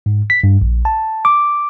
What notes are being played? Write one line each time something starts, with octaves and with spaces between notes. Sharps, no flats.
G#2
B6
G2
A#1
A5
D6